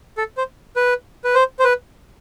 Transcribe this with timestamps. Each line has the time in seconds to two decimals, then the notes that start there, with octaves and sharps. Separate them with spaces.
0.17 A4
0.37 C5
0.76 B4
1.24 B4
1.35 C5
1.59 C5
1.64 B4